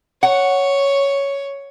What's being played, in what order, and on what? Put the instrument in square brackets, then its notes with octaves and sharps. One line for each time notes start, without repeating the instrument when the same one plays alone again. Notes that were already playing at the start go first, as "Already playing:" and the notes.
[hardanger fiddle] C#5 [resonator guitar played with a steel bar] F#5